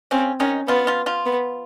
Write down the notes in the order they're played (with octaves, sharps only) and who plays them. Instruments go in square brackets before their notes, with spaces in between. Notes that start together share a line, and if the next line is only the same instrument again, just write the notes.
[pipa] C#3 C#4 [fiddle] C4
[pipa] D#3 D#4 [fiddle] C#4
[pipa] F3 F4 [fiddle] B3
[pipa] F3 F4
F3 F4
[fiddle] B3